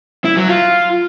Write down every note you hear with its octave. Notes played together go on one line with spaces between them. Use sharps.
E4
F#3
F4